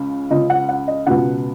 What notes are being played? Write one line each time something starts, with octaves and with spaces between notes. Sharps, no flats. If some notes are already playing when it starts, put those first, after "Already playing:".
Already playing: C#2 C#3
C#2 C#3 D#5
F#5
F#5
D#5
C#2 B2 F#5